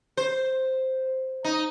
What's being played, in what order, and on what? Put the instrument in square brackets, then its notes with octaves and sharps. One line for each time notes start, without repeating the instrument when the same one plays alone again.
[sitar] C5
D#4